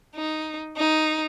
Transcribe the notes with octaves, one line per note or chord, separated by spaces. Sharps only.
D#4
D#4